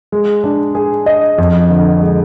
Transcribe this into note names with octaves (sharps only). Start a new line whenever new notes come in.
G#3
D4
G#4
D#5
F2
D3
G#3